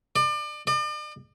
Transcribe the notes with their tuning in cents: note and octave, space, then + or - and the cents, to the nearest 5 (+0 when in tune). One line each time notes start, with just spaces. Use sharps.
D5 +35
D5 +45